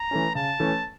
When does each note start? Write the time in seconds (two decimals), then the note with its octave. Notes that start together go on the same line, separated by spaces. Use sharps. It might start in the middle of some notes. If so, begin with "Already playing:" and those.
Already playing: A#5
0.11 E3 A3 C#4
0.35 C#3 A5
0.60 E3 A3 C#4